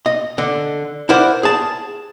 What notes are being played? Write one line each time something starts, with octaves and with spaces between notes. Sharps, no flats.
D#5
D3
E4 A#4 C5 D5 F#5
G#4 A5